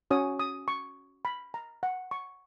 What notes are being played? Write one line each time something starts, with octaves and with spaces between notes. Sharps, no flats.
C#4 F#4 C#5 D#6
D#6
C#6
B5
A#5
F#5
C#6